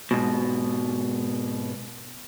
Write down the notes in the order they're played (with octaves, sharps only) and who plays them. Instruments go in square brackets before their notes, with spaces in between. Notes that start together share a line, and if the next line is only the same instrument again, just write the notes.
[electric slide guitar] G#2 B2